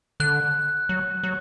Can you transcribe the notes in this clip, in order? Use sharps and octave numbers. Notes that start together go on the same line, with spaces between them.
D3 F#6
F#3
F#3